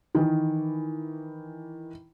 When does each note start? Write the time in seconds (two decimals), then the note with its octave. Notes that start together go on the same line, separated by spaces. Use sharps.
0.15 D#3 E3